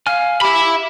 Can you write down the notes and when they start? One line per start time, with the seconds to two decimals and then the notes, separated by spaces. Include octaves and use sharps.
0.07 F5 G#5 F6
0.41 G4 E5 B5